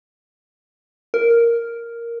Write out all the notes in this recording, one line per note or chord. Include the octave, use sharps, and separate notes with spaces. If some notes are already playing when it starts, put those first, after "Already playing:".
A#4